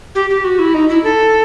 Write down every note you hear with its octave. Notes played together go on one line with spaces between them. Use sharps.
G4
G4
F#4
E4
D#4
E4
A4